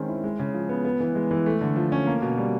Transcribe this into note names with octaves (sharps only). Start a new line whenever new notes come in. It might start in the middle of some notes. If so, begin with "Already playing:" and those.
Already playing: D#3 G#3 C4 C#4
E4
G#3
C#3
F3
B3
B3
E3
G#3
E3
A3
D3
F3
C#4
A#3
B2
G3